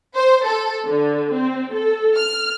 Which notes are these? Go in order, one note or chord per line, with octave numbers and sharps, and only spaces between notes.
C5
A4
D3
C4
A4
F6